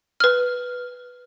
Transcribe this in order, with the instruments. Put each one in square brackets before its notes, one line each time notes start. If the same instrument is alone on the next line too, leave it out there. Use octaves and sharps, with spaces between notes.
[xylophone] B4 F6